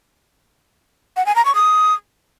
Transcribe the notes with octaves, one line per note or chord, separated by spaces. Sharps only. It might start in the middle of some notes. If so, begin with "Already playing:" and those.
F#5
G#5
A#5
C#6
D#6